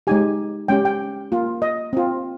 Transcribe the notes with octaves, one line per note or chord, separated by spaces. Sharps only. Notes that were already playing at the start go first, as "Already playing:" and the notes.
G#3 D#4 G4 G#5
G#3 C#4 G4 G5
G5
A#3 F4
D#5
C4 F4